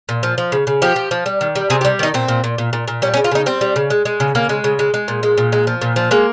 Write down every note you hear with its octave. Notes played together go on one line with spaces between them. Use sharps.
A#2
F3
F3
C#3
C#3
F3 G4
F3
F3
G3
D#3
G3
C3 G#4
G4
G3
D#3 D#4
A#2 C4
A#2
A#2
A#2
A#2
A#2
G3 C#4
C#4
C#3
F4
C#3 D#4
G3 C4
G3
C#3
G#3
G#3
C#3
C#3 A#3
G#3
C#3
G#3
G#3
A#2
G#3
A#2
G#3
F3
A#2
F3
G#3 A#3